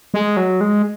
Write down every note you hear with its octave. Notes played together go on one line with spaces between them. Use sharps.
G#3
F#3
G#3